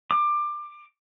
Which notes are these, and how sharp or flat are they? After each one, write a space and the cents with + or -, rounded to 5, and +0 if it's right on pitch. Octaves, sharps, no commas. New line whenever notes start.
D6 +20